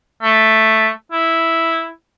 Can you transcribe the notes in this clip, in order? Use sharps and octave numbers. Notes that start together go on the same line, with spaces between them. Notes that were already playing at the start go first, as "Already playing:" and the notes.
A3
E4